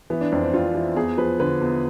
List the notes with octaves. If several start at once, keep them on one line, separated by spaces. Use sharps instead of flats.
E3 B3
D4
F2 D4
C4
F2 F4
E3
E2 G#4
F3 B4
D3 B4
E2